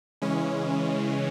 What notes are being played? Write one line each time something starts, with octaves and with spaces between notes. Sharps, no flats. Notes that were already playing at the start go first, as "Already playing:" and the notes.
C#3 E3 G#3 C#4